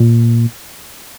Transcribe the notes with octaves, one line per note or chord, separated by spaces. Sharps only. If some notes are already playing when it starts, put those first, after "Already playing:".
Already playing: A#2